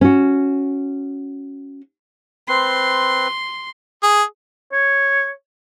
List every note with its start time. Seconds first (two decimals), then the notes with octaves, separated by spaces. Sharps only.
0.01 C#4 F#4
2.49 C4 B4 C6
4.03 G#4
4.73 C#5